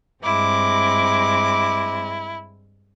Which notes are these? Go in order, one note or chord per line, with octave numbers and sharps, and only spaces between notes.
G2 G#3 C4 E4 D6